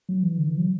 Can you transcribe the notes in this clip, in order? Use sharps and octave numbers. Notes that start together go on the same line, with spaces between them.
F#3
E3
D3
E3
F#3